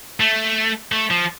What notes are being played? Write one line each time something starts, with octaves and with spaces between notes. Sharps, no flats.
A3
A3
F3